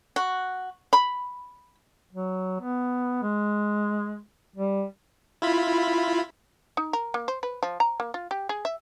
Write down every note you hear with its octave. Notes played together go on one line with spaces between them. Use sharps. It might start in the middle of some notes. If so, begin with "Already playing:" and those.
F#4
B5
F#3
B3
G#3
G3
E4 F4 B5
D#4
A#4
A#3
C5
B4
F3
A#5
A#3
F4
G4
G#4
E5